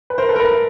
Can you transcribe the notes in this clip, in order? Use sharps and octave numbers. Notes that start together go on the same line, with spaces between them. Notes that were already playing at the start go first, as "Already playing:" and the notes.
B4
A#4 C5
A4 B4
A#4
A4 B4
A#4